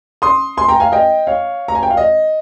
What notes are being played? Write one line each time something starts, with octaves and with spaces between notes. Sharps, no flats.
C6 D#6
G#5 C6
G5 A#5
F5 G#5
D#5 G5
C#5 F5
A#5
G#5
G5
F5
D#5